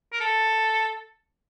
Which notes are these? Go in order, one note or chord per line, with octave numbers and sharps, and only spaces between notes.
A#4
A4